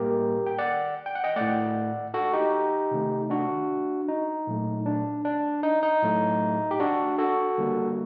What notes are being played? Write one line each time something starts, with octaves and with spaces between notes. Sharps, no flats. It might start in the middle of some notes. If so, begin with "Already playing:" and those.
Already playing: A2 G3 A#3 G4 A#4
G5
D5 F#5
G5
F#5
D#5 G5
A2 A3 D5 F#5
F#4 A4
D#4 G4
C3 D#3 A3
D4 F#4
D#4
A#2 F#3 A3
D4
D4
D#4
D#4
A2 F#3 A3
G4
D4 F#4
F#4 A4
D3 G3 A#3